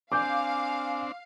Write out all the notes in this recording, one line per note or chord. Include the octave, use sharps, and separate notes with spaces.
C4 D4 F5 G#5 D6 G6